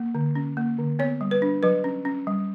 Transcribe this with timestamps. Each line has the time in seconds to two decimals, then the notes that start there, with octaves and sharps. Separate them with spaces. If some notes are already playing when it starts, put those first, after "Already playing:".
Already playing: A#3
0.15 D3
0.35 C#4
0.57 A#3
0.78 D3
0.99 B3 C#5
1.21 G3
1.31 B4
1.42 D4
1.63 F#3 B4
1.84 C#4
2.05 C#4
2.27 G3